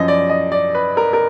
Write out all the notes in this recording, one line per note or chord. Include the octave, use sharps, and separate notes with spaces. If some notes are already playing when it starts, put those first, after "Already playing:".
Already playing: F#2 F3 D#5
D5
D#5
D5
B4
A#4
A#4